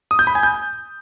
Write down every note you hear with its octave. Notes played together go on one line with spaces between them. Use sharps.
D#6
G6
B5
G#5
G6